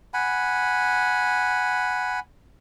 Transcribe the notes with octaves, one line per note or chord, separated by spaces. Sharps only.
F#5 G#5 B5